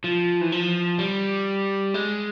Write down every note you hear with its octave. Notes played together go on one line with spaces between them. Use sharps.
F3
E3
F3
G3
G#3